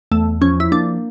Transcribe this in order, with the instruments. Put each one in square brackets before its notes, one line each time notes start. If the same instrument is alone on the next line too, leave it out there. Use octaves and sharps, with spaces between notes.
[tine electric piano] E2 [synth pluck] A3
[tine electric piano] F3 [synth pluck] C#4
[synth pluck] E4
[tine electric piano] A#3 [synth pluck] D4